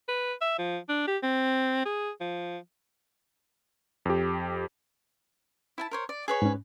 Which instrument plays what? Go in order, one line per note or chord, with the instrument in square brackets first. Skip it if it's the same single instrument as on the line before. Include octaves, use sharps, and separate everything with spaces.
[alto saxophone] B4
E5
F3
D4
G4
C4
G#4
F3
[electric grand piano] F2 G4
[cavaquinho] E4 G#5 A5
A#4 C5 C#5
D5
G#4 B4 C#5
[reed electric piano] G#2 C#4